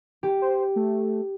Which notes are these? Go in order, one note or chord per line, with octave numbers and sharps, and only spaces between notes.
G4
C5
A3